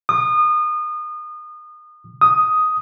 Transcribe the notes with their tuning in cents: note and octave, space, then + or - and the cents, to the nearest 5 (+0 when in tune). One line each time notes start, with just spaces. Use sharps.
D#6 -30
D#6 +5